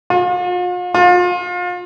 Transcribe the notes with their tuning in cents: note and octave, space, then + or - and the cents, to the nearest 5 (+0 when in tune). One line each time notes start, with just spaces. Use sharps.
F4 +45
F4 +35